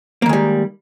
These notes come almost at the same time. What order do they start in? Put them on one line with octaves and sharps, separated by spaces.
A#3 D#3 G#3 G3